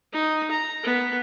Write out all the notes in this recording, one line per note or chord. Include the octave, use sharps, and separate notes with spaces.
D#4
A#5
B3